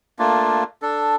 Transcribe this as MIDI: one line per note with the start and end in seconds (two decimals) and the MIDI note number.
0.19 0.64 57
0.19 0.64 58
0.19 0.64 62
0.19 0.64 65
0.82 1.16 62
0.82 1.16 69